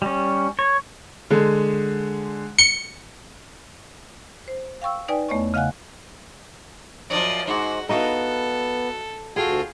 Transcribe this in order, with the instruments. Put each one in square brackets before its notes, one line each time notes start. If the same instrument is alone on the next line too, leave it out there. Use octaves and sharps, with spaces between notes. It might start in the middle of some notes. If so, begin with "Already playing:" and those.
[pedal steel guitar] G3 C#4
C#5
[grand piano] D3 G#3
[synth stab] C#7 [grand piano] G7
[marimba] C5
F5 G5 C#6 E6
D#4 B4 D5 G5 G#5
E2 A3 B3 C#5 D#5 C#6
C#3 D#5 F5 F#5 G#5 F#6
[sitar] F#2 D#3 F3 [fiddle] D5 D#5
[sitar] G#2 [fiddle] F#4
[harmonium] B3 [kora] D#4 D#5 F5 [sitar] E4 F#4 [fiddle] A4
[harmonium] D2 F#4 A4 [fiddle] F4 [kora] G#4 G5